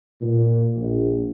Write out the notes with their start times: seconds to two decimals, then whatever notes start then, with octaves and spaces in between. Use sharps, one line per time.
0.21 A#2
0.76 A#1